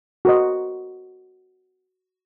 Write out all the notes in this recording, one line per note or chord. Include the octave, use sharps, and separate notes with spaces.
F#4 A#4 C5 D#5